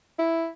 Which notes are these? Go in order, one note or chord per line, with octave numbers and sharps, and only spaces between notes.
E4